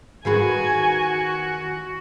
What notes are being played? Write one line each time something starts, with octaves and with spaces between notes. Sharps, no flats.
D#3 F#4 G#4 B4 G#5